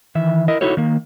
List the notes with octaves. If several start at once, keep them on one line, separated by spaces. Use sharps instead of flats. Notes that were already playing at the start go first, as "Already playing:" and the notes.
D#3 E3 E5
E4 A#4 D#5
D#4 E4 F#4 A4 C#5
D#3 A#3